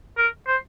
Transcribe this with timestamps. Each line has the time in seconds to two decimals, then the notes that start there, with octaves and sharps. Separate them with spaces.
0.18 A#4
0.47 C5